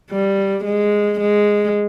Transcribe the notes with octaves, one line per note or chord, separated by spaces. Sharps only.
G3
G#3
G#3